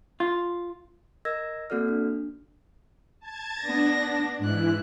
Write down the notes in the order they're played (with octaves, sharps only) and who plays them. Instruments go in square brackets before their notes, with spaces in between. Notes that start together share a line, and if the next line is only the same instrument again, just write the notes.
[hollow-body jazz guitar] F4
[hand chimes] A#4 D#5 E6 G#6 A#6
A#3 C4 F#4 A4 D5 F6
D4
[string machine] A5 G#6 A6
[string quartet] B3 A#6 [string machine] D4
[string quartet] G#2 F#6 [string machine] E3 E4